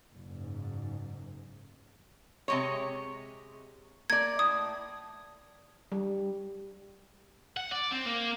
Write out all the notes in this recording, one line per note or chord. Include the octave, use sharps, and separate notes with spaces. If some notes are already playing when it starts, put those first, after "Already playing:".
F#1 G#2
C3 G#3 C#5
A#3 D5 G#6
A2 D#6
G3
F#5
D5
C4
A#3